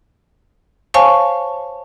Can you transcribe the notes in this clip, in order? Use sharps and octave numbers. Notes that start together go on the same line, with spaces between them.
C5 C#5 F5 G#5 A5 C#6